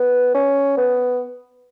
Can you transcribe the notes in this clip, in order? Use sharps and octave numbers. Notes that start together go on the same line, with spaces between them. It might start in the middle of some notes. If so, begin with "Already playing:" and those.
Already playing: B3
C#4
B3